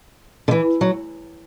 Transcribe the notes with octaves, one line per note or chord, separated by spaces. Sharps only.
D3
E3
F#3